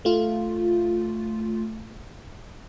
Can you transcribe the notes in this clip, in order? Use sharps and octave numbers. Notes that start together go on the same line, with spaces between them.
A3 F4